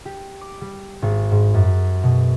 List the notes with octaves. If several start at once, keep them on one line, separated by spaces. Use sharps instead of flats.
G4
D6
G3
G#1
G#2
F#2
B2